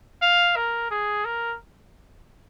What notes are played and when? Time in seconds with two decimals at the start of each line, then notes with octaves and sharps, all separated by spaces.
0.22 F5
0.56 A#4
0.91 G#4
1.25 A#4